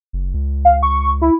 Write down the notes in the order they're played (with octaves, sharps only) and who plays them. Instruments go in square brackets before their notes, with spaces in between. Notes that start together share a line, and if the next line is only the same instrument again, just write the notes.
[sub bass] F#1
C#2
[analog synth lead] F5
C#6
E4